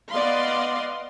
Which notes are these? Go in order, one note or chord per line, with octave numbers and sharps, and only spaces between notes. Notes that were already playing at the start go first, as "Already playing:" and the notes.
B3 D5 D#5 F5 C6